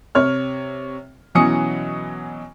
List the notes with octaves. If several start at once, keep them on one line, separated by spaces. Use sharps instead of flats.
C3 C#5 F6
B2 E3 F#3 C#4 D#6 C#7